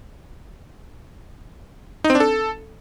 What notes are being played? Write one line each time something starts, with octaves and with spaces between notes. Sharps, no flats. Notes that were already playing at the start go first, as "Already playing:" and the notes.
D#4
C4
D4
A4